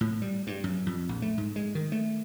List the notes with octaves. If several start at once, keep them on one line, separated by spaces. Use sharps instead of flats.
A2
G3
G2
F#2
F2
A#1
A3
G#2
G#3
D#3
A3